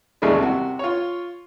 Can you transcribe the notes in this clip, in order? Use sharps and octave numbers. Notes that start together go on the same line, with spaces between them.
A1 D#2 C#3 G3 G#3
C3 F#4
F4 C#5